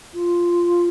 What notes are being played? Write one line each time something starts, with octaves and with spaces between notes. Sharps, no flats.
F4